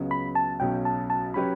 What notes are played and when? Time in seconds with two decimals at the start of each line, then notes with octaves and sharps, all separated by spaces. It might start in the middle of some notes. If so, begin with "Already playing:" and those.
Already playing: C#2 C#3 F#3 B3
0.11 B5
0.35 A5
0.60 B1 B2 F#3 C#4 G5
0.85 A5
1.10 A5
1.34 F#3 C#4 G4 B4 B5